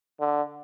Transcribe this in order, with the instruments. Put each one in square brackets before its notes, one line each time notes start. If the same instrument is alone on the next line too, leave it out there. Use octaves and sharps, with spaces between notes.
[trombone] D3